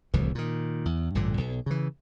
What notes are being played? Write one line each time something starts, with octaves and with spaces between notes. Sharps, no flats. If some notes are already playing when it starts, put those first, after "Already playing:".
D1 C2 E3 F3
A#2 D#3
E2
A1 G2 A#2 D3
B1
C#3 E3